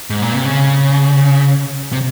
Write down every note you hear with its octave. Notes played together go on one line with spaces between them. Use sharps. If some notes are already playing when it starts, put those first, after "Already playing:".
G#2
A#2
C3
C#3
C3